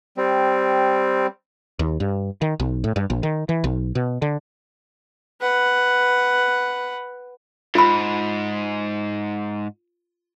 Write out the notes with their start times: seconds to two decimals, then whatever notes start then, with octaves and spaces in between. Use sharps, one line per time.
0.17 G3 C4
1.79 D#2
2.00 G2
2.42 D#3
2.60 B1
2.84 A2
2.96 G2
3.10 A#1
3.23 D#3
3.49 E3
3.64 B1
3.95 B2
4.22 D3
5.40 B4 F#5
7.75 G#2 F4 B5